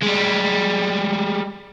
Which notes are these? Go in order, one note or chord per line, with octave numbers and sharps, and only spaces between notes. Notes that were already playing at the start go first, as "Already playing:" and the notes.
G3 G#3